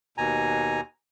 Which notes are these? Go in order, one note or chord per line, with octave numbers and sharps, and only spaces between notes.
D#2 B2 G#5 A#5